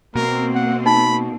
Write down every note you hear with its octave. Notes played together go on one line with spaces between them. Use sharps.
B2 A#3 C4 A#4
F#5
D#4 B5